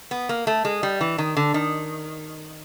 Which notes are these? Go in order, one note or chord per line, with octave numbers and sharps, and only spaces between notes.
B3
A#3
A3
G#3
G3
E3
D#3
D3
D#3